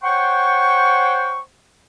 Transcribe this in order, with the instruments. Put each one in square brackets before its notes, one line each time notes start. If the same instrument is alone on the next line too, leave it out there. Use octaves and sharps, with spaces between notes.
[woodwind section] C5 C#5 F#5 G5 C6 C#6